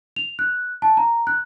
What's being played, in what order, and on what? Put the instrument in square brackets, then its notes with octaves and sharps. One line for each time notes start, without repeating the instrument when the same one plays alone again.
[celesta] F7
F#6
A5
A#5
F#6